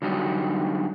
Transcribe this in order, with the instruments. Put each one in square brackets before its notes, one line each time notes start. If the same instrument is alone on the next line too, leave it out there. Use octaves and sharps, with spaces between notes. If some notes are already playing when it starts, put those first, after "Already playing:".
[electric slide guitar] D3 F#3 G3 D#4